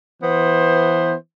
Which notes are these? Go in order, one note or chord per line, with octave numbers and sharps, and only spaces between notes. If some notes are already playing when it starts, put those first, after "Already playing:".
E3 B3 C5